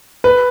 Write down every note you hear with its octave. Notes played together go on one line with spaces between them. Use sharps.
B4